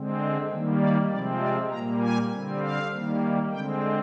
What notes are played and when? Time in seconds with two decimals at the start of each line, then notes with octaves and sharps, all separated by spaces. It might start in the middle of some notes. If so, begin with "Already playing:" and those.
Already playing: D3 G#3 C4
0.49 D#3 G3 A#3
0.80 D5
1.10 C3 F3 G#3 C4 D5
1.40 D5
1.70 A#2 G3 A#3 A#5
2.00 G#5
2.30 D3 G3 C4
2.60 F5
2.91 D#3 G3 A#3
3.51 D3 G#3 C4 G5